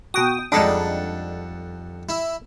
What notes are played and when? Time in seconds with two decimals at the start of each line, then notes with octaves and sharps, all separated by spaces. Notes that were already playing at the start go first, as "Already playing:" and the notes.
0.14 B2 F#4 G5 D#6
0.52 F2 G3 G#3 D4 D#4 A4 F#5
2.09 E4